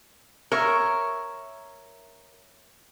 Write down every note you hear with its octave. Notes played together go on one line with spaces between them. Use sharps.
A#4 C#5 E5 C#6